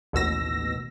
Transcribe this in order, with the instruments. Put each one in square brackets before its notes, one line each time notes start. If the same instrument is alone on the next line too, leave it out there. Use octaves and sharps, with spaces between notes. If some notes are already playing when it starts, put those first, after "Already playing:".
[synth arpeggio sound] A1 D#2 B2 E6 A#6